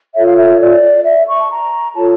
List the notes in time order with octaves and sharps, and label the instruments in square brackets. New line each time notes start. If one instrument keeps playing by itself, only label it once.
[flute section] F4 A4 C#5 E5
F5
E5
D5
E5
C#6
A5
A#5
F4 A4 C#5 A5